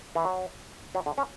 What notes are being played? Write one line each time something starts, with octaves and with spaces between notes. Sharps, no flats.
E3
F#3
F#3
D3
C#4